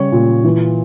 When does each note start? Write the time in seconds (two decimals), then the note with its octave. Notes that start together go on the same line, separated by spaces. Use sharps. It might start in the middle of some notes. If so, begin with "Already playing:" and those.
Already playing: C#3 G3 C#5
0.12 A#2
0.44 E3